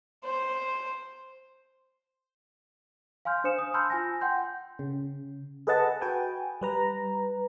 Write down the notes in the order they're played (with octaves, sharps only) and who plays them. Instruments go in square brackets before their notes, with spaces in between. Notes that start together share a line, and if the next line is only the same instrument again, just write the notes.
[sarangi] C5
[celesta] F5 G#5 C6 F6 G6
D4 C5 D#6 C#7 E7
G#5 D#6
A5 B5 C6 E6 F6 G6
F4 G#5 A#6
F#5 G5 C6 G6
[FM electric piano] C#3
G#4 A4 B4 D#5 F#5 A5
F#4 B4 G5 G#5
G3 B4 A#5